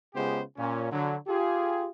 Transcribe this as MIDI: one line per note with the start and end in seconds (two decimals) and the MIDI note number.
0.15 0.42 49
0.15 0.42 56
0.15 0.42 59
0.15 0.42 65
0.15 0.42 67
0.15 0.42 72
0.57 0.87 46
0.57 0.87 61
0.92 1.16 50
0.92 1.16 54
1.28 1.87 65
1.28 1.87 67
1.28 1.87 68